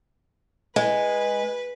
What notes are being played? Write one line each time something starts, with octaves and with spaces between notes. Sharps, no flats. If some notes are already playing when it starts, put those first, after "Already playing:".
G#3 B4